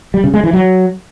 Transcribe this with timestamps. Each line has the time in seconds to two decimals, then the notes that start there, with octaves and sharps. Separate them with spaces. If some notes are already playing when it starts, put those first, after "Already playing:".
0.14 G3
0.24 C#3
0.34 G#3
0.44 E3
0.53 F#3